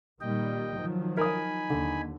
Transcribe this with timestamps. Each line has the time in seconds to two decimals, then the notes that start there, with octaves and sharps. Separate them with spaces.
0.21 A#2 D#3 G3 D#5 G5
0.75 D#3 F3 F#3
1.17 D#4 A#4 G#5 B5 D#6
1.70 D#2 D3